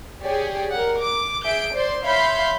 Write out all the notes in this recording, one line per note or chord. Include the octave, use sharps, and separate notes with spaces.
G4 G#4 C#5 D5
A#4 F#5
D6
G#4 E5 G6 D7
C5 D5 C6
C#5 E5 F5 B5 C6 G6